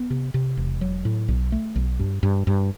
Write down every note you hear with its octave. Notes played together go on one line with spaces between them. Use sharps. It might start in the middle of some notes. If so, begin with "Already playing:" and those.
Already playing: B3
C3
C3
E1
F#3
A2
B1
A3
B1
G2
G2
G2